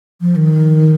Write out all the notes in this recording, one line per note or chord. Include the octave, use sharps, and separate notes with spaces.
F3
D#3